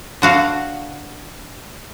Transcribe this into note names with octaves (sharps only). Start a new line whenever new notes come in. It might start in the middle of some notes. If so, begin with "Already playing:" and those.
D3 F#4 F5